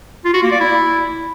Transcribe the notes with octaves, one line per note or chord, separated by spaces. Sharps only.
F4
F#4
A#3
D5
E4